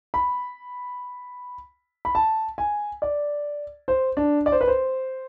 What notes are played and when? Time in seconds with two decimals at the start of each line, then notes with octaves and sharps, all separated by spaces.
0.14 B5
2.05 B5
2.15 A5
2.58 G#5
3.02 D5
3.88 C5
4.17 D4
4.46 D5
4.52 C5
4.61 B4
4.67 C5